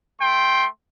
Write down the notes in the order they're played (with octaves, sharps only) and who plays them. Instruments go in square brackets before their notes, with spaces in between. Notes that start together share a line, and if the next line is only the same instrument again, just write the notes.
[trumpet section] A3 G5 C6